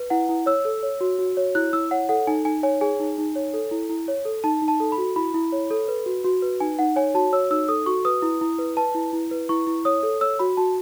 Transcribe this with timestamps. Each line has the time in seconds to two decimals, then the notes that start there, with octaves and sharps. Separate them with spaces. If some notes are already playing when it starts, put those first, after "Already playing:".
Already playing: B4
0.10 E4 F#5
0.29 E4
0.46 C#5 E6
0.65 A4
0.83 C#5
1.01 F#4
1.19 F#4
1.37 C#5
1.55 E4 F#6
1.73 E4 E6
1.91 C#5 F#5
2.09 A4 F#5
2.27 D#4 G#5
2.45 D#4 G#5
2.63 C#5 G#5
2.81 G#4 G#5
3.00 D#4
3.18 D#4
3.36 C#5
3.54 A4
3.71 E4
3.90 E4
4.08 C#5
4.25 A4
4.44 D#4 A5
4.62 D#4
4.68 A5
4.80 A4
4.92 B5
4.98 F#4
5.16 E4 B5
5.34 E4
5.52 C#5
5.70 A4
5.88 B4
6.06 F#4
6.24 F#4
6.42 B4
6.60 D#4 G#5
6.79 D#4 F#5
6.96 C#5 G#5
7.14 F#4 A5
7.33 C#5 E6
7.51 D#4 E6
7.68 A4 D#6
7.86 F#4 C#6
8.05 B4 D#6
8.22 E4
8.41 E4
8.59 B4
8.77 B4 A5
8.95 E4
9.13 E4
9.31 B4
9.49 E4 C#6
9.67 E4
9.85 C#5 D#6
10.03 A4
10.21 C#5 E6
10.39 F#4 B5
10.57 F#4 A5